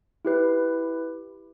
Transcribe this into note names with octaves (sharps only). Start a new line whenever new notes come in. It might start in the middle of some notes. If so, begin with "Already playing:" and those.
E4 G4 B4